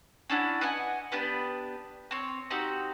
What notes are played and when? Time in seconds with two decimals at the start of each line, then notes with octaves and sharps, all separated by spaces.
0.30 C#4 D4 E4 F#4
0.61 B4 D#5 F#5 G#5
1.12 B3 D4 G4 B4
2.11 C4 C#5
2.50 C4 D#4 F#4 G4